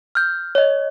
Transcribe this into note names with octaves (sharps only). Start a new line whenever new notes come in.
F6 G6
C#5 D#5